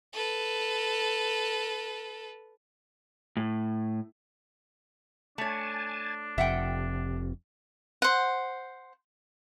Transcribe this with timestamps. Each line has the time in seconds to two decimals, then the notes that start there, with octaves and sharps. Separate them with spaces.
0.13 A4 B4
3.37 A2
5.38 A3 D4 C#5 G#5 A5
6.38 F1 F2 C3 E5 F#5 G5
8.02 C5 F#5